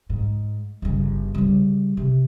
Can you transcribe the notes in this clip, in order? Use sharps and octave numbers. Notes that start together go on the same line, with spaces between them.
G#2
G1 C#3
C#3 G3
C3